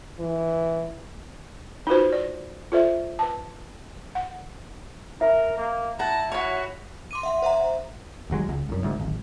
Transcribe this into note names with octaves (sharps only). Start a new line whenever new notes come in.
E3
D#4 F4 F#4 B4 C5
D5
F4 A4 C5 D5 E5
B4 A5
F#5
A#4 E5
A#3
E4 F#5 A5 A#5
F#4 C#5 B5
C6 D6 D#7
E5 F#5 C6
C5 E5 F#5 A#5
E1 D#2 F#3 G#3
C#2
C2 F#2
D2 G#2
D1 G#1